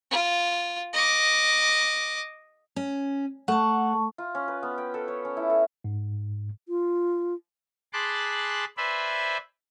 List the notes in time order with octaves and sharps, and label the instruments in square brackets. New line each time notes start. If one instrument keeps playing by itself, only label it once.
[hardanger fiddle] F4
D#5 D6
[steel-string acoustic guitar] C#4
[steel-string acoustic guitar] A3 [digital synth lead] F#5 [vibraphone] A5 C#6
[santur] F4
C#4
B4
B3
G5
A4
C#5
C#4
E4
A4
[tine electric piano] G#2
[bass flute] F4
[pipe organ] G#4 A5 B5 C6 D6 F#6
B4 C5 D5 E5 G#5 B5